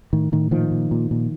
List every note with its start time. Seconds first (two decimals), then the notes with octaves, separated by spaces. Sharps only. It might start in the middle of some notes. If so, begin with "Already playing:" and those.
0.13 A2 D#3
0.32 A2 D#3
0.51 A#2 D#3 F3
0.71 A#2
0.91 A#2
1.11 A#2